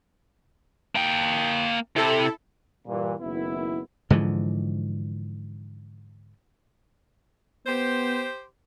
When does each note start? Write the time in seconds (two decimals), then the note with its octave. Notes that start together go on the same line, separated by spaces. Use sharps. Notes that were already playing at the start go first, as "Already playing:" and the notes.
0.95 A#3 G5
1.96 C3 E4 A4
2.87 G2 A#2 E3
3.20 F#1 D#3 B3 E4
4.10 G#2 D3 E3 F3
7.67 B3 G4 C5